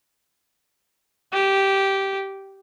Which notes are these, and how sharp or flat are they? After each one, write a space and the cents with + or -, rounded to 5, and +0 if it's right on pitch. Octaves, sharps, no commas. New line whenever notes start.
G4 -10